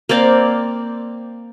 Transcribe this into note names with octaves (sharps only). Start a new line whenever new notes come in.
A#3 C4 D5 F5